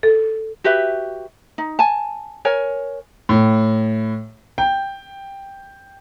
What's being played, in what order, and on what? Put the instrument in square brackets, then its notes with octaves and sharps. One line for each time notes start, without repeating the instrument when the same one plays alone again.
[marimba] A4
[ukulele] F#4 G4 B4 E5
D#4
G#5 A5
A#4 C#5 G#5
[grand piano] A2
G5